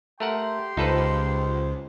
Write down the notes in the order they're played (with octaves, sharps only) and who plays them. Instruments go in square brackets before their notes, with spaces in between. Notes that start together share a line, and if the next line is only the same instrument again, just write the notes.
[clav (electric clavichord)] A3 A#4 F#5 [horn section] G4 G5 C6
[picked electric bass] C#2 [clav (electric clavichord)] D#4 A4 B4 [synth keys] F4 C5